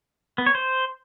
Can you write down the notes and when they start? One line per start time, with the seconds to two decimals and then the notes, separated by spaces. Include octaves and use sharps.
0.38 B3
0.46 C#5
0.55 C5